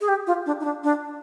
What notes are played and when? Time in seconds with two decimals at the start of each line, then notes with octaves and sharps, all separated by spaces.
0.01 G#4
0.08 G4
0.27 F4
0.46 D4
0.60 D#4
0.65 D4
0.84 D4